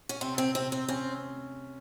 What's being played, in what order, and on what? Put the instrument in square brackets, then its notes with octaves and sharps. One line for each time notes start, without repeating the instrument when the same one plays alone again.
[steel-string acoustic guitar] C#4
[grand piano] C3 [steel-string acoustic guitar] C4
[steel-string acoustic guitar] C4
[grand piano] C3 [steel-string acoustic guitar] C4
[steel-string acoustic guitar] C4
[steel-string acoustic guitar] C4 [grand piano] C#4